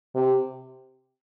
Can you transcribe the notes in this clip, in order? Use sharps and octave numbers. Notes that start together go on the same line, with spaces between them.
C3